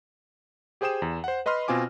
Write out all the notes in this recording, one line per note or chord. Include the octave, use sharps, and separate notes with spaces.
G4 G#4 C5 G5 D#6 E7
E2
C5 F#5
B4 D#5 B5 C6 F6
B2 C4 F4 G#5 D6